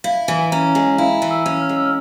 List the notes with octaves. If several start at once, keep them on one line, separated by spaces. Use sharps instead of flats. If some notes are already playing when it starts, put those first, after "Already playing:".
E4 F5
E3 G#5
C#4 A#5
G#3 G#5
E4 F5
E3
E6
C#4
F6
G#3
E6
F6